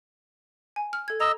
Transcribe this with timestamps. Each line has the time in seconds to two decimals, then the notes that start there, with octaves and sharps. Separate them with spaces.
0.76 G#5
0.93 F6
1.08 A4 G#6
1.20 D#5 A#5 E6